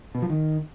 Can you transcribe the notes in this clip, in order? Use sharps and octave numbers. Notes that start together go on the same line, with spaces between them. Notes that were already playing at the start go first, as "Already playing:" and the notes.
B2
F3
D#3